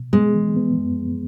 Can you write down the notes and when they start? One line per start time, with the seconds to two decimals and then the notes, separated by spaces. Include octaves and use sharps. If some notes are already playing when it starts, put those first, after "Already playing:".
Already playing: B2
0.13 G#3 B3
0.35 E3
0.56 B3
0.78 F#2
1.00 F#2